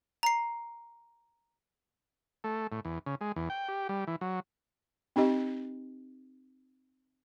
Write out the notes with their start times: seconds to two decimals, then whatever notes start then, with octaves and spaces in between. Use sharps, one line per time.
0.23 A#5 C7
2.44 A3
2.72 A2
2.85 E2
3.06 C#3
3.21 G#3
3.36 E2
3.50 G5
3.69 G4
3.89 G3
4.07 E3
4.21 F#3
5.16 C4 D#4 G4 D#5